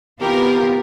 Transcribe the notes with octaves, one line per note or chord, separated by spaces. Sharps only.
C3 E3 B3 F4 G4 A#4